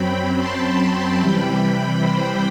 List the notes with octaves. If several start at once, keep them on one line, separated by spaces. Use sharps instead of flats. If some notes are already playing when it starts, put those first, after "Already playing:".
Already playing: F#2 F#3 C4 G5 B5
A5 C6
C3 E3 G3 G5 B5
C5